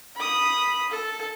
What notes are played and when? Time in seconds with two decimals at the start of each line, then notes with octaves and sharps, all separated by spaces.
0.16 B5 D#6
0.90 A4